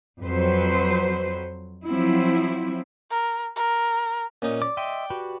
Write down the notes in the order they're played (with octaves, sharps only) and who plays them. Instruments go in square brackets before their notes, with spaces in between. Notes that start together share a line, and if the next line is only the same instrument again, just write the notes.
[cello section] F2 F#3 B4 C5
F3 F#3 C4 E4
[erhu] A#4
A#4
[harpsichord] A#2 D#4 [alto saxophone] C#4
[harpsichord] D5 [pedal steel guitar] D6
[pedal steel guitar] D#5 E5 C6 [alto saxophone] G5
[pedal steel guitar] F#4 G4 B4